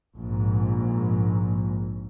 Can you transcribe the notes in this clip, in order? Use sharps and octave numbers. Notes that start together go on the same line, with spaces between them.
A#1 G#2